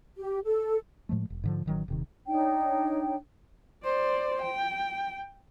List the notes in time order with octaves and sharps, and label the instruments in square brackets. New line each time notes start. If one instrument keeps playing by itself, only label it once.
[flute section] G4
A4
[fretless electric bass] A2 F3 G#3 A3
E1
G#2 D3 F3
A1 D#3 F#3
D#1 C3 D#3
[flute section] D4 D#4 C#5 G5
[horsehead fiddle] C5 D5
G5